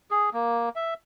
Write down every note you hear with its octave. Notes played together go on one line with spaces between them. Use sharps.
G#4
A#3
E5